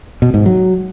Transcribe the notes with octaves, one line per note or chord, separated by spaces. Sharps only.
B2
G#2
F#3